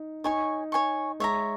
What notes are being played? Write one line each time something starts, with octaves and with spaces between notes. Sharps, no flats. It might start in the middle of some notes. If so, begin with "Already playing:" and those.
Already playing: D#4
D#4 C#5 G#5 C#6
C#5 G#5 C#6
G#3 C#5 E5 A#5